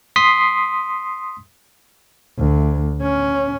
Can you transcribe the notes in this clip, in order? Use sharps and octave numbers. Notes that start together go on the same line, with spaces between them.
C6 D#6 B6 C7
D2
C#4